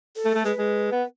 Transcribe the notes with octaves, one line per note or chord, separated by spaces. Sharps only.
A4
A3
A3
G#3 B4
G#3
B3